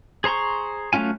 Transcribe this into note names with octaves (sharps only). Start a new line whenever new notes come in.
G#4 C5 A#5 C6 C#6
F#3 A3 C#4 F4 G#5